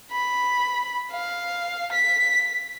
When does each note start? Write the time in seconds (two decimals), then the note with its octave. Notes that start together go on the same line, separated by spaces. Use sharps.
0.11 B5
1.12 F5
1.92 B6